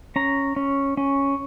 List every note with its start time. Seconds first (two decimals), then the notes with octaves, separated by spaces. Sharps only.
0.16 C#4 A#5
0.56 C#4
0.97 C#4